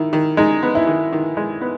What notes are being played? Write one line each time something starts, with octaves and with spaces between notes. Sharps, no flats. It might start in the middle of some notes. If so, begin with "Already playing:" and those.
Already playing: D#3 E4
D#3
G#3 D#4
B3
E4
D#3
D#3
G#3
B3